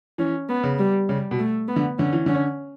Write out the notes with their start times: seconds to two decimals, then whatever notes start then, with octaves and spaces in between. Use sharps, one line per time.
0.18 E3 C#4
0.49 B3
0.63 C#3
0.79 G3
1.09 C#3 G3
1.31 B2
1.39 A3
1.68 B3
1.76 D3
1.98 D3 C#4
2.13 E3
2.26 D3 C#4